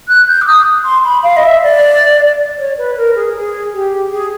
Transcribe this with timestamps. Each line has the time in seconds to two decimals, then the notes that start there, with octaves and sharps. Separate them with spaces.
0.08 F#6
0.28 G6
0.42 D6
0.47 D#6
0.85 C6
1.04 B5
1.23 F5
1.37 D#5
1.43 E5
1.63 D5
2.58 C#5
2.78 B4
2.97 A#4
3.16 G#4
3.35 G#4
3.73 G4
4.12 G#4